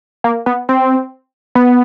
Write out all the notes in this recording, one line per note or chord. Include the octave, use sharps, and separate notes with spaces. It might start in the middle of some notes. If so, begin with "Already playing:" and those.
A#3
B3
C4
B3